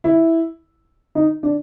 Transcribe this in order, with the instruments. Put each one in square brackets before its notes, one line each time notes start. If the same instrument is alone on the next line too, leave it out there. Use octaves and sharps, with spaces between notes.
[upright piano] E4
D#4
D4